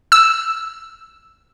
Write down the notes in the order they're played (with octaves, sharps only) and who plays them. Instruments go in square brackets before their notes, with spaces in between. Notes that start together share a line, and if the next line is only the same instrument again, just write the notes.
[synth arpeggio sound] E6